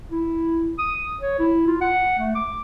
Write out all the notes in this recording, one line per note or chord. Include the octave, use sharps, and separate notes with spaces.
E4
D#6
C#5
E4
F4
F#5
A3
D6